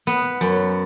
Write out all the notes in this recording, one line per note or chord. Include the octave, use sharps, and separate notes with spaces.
B3
F#2